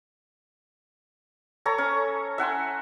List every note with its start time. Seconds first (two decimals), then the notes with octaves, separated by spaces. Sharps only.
1.66 A4 C#5 A#5
1.78 C#4
2.38 E5 F#5 G#5 C6